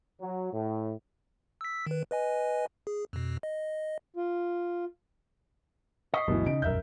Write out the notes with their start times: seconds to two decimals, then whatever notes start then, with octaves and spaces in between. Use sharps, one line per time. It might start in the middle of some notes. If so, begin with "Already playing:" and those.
0.21 F#3
0.53 A2
1.61 E6 B6
1.87 D#3 B4
2.11 B4 D#5 G#5
2.87 G#4
3.13 F2 B2
3.43 D#5
4.16 F4
6.14 D#5 C#6 B6 C7
6.28 G1 D2 B2 E3 F#3
6.46 C#3 D#4 D7
6.62 E1 A#1 F#2 A#4 E5 G6